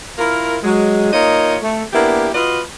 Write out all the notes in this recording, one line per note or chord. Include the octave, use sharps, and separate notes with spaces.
E4 F4 A#4
F#3 G#3
A#3 D#4 F4 C#5 D#5
A3
A#3 B3 D4 E4 G4
F4 F#4 B4 D#5